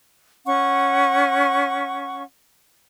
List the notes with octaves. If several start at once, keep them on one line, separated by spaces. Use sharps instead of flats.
C#4 F#5 C#6